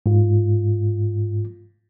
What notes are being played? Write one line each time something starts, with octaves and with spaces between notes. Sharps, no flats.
G#2 F4